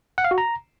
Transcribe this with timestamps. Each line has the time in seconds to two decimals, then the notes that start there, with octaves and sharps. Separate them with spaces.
0.18 F#5
0.24 F5
0.31 F#4
0.38 A#5